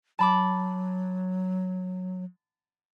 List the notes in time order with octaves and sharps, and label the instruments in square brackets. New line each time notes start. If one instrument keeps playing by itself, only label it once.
[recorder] F#3 [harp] A5 B5 D6